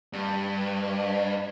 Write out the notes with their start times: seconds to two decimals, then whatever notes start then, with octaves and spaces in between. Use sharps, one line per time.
0.13 G2